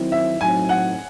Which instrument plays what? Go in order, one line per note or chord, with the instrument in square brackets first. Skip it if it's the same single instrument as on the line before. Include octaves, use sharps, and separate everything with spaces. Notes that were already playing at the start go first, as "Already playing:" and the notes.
Already playing: [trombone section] D#3 F#3 C4 E4
[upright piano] E5
[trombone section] A2 F#3 C4 D#4 [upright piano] G#5
[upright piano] F#5